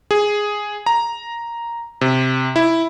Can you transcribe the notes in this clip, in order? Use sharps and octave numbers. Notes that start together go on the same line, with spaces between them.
G#4
A#5
C3
E4